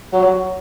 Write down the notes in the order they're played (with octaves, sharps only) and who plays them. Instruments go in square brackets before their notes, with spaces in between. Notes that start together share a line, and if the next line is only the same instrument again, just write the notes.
[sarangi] F#3